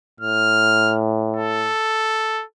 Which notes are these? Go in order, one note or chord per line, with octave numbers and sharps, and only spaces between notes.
A2 F6
A4